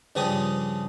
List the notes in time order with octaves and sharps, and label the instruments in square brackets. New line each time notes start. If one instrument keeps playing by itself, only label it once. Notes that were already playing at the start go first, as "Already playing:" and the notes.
[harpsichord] G2 C#3 F3 G4 G#4 D#6